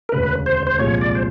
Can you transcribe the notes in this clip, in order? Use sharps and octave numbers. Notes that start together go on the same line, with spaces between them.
A#4
E1 D2 C#3 B4
C5
C5
C2 A#2 F3 G#3 C#5
D5
C5